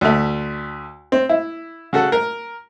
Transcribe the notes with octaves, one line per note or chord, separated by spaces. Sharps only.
D2 A3
C4
E4
C#3 F#4 A4
A#4